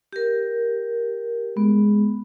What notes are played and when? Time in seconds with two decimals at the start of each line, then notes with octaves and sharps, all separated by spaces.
0.13 G4 A#4
1.57 G#3 B3